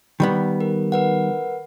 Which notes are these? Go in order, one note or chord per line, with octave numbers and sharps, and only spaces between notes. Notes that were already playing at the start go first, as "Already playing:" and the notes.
D#3 G3 B3
A#4
A#4 B4 F#5